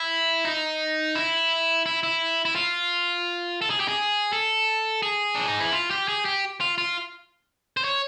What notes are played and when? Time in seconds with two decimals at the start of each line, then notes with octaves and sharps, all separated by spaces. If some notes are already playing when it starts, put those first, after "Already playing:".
Already playing: E4
0.45 D#4
1.15 E4
1.86 E4
2.03 E4
2.45 E4
2.56 F4
3.62 A4
3.70 G#4
3.80 G4
3.88 G#4
4.33 A4
5.03 G#4
5.35 D4
5.48 D#4
5.60 E4
5.73 F4
5.91 G4
6.08 G#4
6.25 G4
6.61 F4
6.78 F4
7.77 C5
7.84 C#5